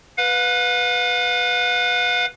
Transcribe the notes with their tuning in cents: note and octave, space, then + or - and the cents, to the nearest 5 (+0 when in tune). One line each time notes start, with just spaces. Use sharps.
B4 +0 F5 +40